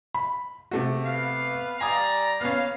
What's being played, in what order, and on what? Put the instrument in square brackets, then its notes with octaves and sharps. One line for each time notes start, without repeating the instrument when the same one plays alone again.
[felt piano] B5
C3 A3 F#4
[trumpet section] B3 B4 F5
[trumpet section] G3 D5 A#5 [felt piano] G#5 D#6
[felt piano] B3 C#4 [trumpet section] F5